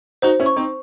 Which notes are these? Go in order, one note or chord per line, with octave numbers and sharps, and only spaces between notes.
D#4 F#4 C5
C#4 E4
C#6
C4 D#4